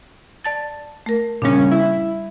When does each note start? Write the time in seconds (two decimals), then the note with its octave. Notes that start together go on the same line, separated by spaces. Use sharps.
0.44 D5 A5 A6
1.06 A3 A#4
1.42 A#2 C#3 G3 C#4 D4
1.71 E4